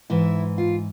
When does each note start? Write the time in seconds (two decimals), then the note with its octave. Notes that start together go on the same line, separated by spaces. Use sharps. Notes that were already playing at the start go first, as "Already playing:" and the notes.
0.10 G#2 E3 E4
0.58 F4